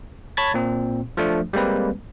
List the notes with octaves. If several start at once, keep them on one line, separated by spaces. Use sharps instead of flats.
C#5 A5 B5 G#6 A6
A#2 C4
F3 A3 D4
G3 G#3 A#3 C4 B4